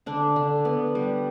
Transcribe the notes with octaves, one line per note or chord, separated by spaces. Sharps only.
D3 D4
D3
B3
G3